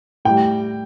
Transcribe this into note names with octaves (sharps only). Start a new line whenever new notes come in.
A2 G3 G5